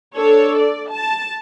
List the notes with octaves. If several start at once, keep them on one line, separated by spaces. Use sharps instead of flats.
D4 A4 C#5
D5
A5